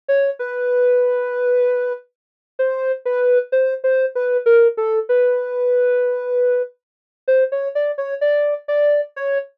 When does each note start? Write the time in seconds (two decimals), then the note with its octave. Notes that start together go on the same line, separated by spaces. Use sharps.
0.08 C#5
0.39 B4
2.59 C5
3.05 B4
3.52 C5
3.84 C5
4.15 B4
4.46 A#4
4.77 A4
5.09 B4
7.28 C5
7.52 C#5
7.75 D5
7.98 C#5
8.21 D5
8.68 D5
9.16 C#5